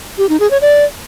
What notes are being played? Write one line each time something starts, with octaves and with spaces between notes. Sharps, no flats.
G4
D#4
G#4
C#5
D5